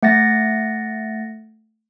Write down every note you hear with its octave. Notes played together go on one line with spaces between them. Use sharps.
A3 F#5 A6 A#6